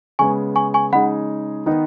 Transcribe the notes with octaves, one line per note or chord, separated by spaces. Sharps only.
C#3 G#3 B3 G#5 C#6
G#5 C#6
G#5 C#6
C#3 G#3 D#4 G#4 F#5 B5
D#3 B3 D#4 B4